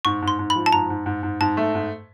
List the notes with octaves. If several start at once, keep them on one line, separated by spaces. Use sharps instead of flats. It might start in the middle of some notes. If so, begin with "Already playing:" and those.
G#2 C#6
G#2
C6
G#2
B5
F3
A5
G#2 A#5
G#2
G#2
G#2
G#2 A5
A3
G#2